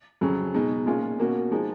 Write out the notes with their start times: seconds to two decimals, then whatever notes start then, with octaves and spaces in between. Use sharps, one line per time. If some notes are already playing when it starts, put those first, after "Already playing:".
0.21 F2 C#3 F#3 C#4
0.54 B2 G#3 D#4
0.86 A#2 G#3 C#4 F4
1.18 B2 A#3 C#4 F#4
1.51 F3 G#3 D#4